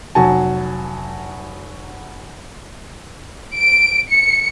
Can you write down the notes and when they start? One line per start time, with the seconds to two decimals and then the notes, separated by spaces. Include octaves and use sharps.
0.15 F1 F#3 F#4 G#5 A5
3.56 D7
4.09 C#7